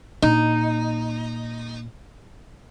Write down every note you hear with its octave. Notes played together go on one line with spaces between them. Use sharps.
A#2 D#4